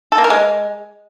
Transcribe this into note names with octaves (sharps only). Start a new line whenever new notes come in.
A4
A#3
A#4
G#3